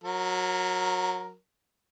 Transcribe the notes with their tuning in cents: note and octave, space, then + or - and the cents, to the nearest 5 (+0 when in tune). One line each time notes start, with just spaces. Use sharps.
F#3 -20 A#4 +0